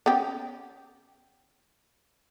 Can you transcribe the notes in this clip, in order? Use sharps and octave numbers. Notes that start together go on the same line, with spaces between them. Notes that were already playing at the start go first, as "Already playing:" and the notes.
B3 C#4 G4